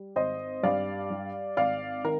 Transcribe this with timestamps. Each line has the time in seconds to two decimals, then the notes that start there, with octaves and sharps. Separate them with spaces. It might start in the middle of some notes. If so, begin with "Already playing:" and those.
Already playing: G3
0.16 G#1 C5 D#5
0.63 G2 D5 F5
1.10 G3
1.57 G#1 D5 F5
2.04 D#3 A#4